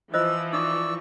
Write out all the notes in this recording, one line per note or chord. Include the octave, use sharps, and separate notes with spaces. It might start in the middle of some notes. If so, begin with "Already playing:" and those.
E3 F3 F4 C5 D#5 E6
D#4 D5 C#6 D#6 E6